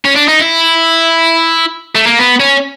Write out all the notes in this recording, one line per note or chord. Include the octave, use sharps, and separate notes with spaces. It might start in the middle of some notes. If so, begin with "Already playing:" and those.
C#4
D4
D#4
E4
A3
A#3
B3
C#4